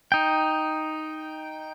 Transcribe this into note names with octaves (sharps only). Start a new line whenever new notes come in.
D#4 G5